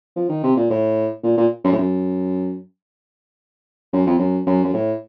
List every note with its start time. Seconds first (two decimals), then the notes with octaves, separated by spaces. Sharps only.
0.16 F3
0.29 D#3
0.44 C3
0.57 A#2
0.70 A2
1.23 A#2
1.37 A#2
1.64 F#2
1.73 A2
1.78 F#2
3.93 F#2
4.06 F2
4.19 F#2
4.47 F#2
4.65 F#2
4.74 A2